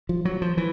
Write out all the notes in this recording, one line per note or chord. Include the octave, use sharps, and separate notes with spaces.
F3
F#3
F3
E3